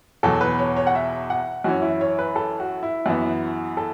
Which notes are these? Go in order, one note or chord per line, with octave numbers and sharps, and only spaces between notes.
E2 B2 F#3 A4
B4
C#5
C#5
F#5
E5
F#5
F#2 E3 C#4 F#4
E4
C#5
B4
A4
F#4
E4
F#2 E3 B3 F#4
A4